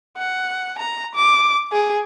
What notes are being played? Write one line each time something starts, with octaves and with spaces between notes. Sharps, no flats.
F#5
A#5
D6
G#4